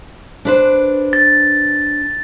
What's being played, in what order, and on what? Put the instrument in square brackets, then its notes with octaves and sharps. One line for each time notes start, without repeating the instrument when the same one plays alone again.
[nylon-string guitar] D4 B4 C5
[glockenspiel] A6